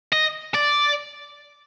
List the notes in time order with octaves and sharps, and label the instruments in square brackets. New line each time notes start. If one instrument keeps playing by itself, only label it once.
[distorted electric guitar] D#5
D5